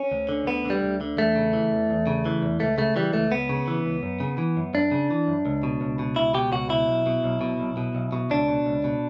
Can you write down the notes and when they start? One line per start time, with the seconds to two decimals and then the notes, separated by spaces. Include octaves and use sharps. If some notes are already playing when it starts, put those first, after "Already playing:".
Already playing: C#4
0.12 D2
0.29 D3
0.46 D2 B3
0.65 D3 G3
0.83 D2
1.01 D3
1.17 E2 A3
1.36 C#3
1.53 E3
1.71 E2
1.90 E2
2.07 C#3
2.26 E3
2.42 E2
2.60 C#2 A3
2.78 C#3 A3
2.96 E3 G3
3.13 C#2 A3
3.31 C#2 B3
3.49 C#3
3.68 E3
3.85 C#2
4.03 F#2
4.20 C#3
4.38 E3
4.57 F#2
4.74 F#2 D4
4.92 C#3
5.10 E3
5.28 F#2
5.46 C#2
5.63 B2
5.81 C#2
5.99 B2
6.16 C#2 E4
6.34 B2 G4
6.52 C#2 F#4
6.69 B2 E4
6.88 B1
7.06 B2
7.24 B1
7.41 B2
7.60 B1
7.77 B2
7.95 B1
8.12 B2
8.30 C#2 D4
8.48 B2
8.66 C#2
8.84 B2